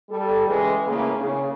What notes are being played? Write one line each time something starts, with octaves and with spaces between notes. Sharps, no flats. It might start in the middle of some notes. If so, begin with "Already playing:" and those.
G3 A4
C#3 E3 G#3
A2 C#3 A#3
C#3